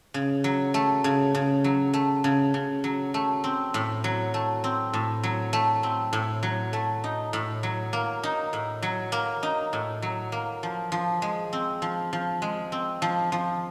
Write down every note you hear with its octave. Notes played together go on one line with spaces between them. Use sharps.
C#3
F#3
A3
C#3
C#3
F#3
A3
C#3
C#3
F#3
A3
C4
A2
F#3
A3
C4
A2
F#3
A3
C4
A2
F#3
A3
D#4
A2
F#3
A#3
D#4
A2
F#3
A#3
D#4
A2
F#3
A#3
F3
F3
G#3
C4
F3
F3
G#3
C4
F3
F3